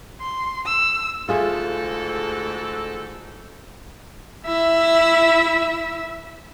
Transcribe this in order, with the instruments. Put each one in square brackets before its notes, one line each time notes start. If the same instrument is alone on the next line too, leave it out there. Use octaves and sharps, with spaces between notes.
[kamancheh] C6
E6
[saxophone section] D2 G#2 A4 [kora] F4 G#4 E5
[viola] E4 E5